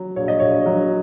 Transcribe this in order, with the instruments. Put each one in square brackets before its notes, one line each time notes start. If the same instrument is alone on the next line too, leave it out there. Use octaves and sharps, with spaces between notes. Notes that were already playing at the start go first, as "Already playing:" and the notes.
Already playing: [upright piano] F#3
A#1 C#5
D#5
A#1 C#5
F#3